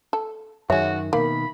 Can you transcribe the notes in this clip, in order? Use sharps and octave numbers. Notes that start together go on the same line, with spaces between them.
A4
F#2 D#3 F#4 G#4 C#5 E5
B2 D#3 A#3 B5